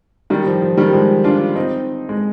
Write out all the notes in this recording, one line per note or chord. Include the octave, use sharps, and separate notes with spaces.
D#3 G3
F3
F3
D#3 G3
F3 G#3
D4 F4
C4 D#4
G#3